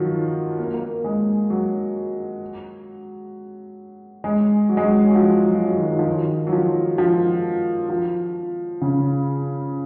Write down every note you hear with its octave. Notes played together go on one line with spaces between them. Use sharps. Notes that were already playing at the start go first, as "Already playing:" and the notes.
Already playing: D#3 F3 F#3
A#3
A#3
G#3
F#3
G#3
F#3
G#3
F#3
F#3
F3
F#3
F3
F#3
D#3
F#3
F3
D#3
F#3
F3
F3
F3
C#3